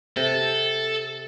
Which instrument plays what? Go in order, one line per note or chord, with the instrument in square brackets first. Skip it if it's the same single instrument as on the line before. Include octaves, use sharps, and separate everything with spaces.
[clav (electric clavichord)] C3 [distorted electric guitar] A4